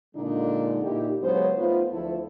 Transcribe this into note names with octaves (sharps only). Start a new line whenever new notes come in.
A#2 D3 G#3 D4 D#4
A#2 D#4 E4 G4
C#3 F#3 G#3 B3 C5 C#5
A3 B3 D#4 F4 B4 C5
D2 F3 E4 A4